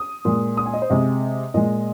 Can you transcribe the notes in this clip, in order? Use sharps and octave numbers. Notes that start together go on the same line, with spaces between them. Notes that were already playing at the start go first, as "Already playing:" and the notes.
Already playing: D#6
A#2 G#3
D#6
G#5
D#5
C5
C3 G#3 D#5
A#2 G#3 D#5